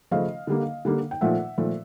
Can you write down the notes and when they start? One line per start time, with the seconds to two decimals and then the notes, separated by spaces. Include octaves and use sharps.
0.11 C#3 F3 A3 D#5 F5
0.47 D3 G3 A#3
0.85 D3 G3 A#3
1.11 G5
1.21 A#2 F3 A3 E5 F#5
1.58 A#2 F3 A3